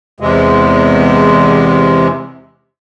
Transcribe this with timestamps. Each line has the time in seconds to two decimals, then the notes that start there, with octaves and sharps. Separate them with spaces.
0.20 E2 C3 G#3